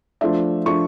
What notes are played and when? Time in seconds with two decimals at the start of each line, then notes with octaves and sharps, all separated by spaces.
0.21 F3 A3 D4 E5
0.66 F3 A3 D4 C#6